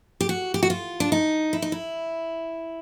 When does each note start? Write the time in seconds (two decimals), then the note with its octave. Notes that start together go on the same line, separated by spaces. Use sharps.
0.21 G4
0.29 F#4
0.54 G4
0.63 F#4
0.70 F4
1.00 D4
1.12 D#4
1.53 E4
1.62 D#4
1.72 E4